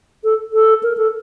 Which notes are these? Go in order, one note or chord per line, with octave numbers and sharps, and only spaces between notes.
A4
A4
A#4
A4